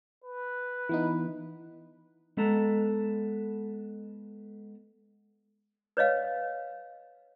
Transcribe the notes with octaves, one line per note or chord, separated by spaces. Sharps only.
B4
E3 B3 D#4
G#3 B3 A4 A#5
B4 C#5 D#5 F5